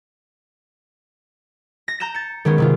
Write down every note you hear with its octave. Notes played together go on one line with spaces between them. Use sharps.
A#6
A#5 G6 A#6 E7
A6 C#7
D#3 G#3 B3 C#4
C3 D#3 F4